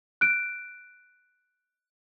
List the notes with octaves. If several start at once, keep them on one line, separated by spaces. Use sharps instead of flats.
F#6 D7